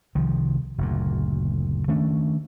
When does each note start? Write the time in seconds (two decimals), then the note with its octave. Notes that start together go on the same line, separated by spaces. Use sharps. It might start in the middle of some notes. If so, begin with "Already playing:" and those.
0.15 C2 D#3 F3
0.78 F#1 D2 A#2
1.88 D#3 A3 C#4 D4